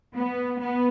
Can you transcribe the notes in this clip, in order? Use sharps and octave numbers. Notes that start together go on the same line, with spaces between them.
B3
B3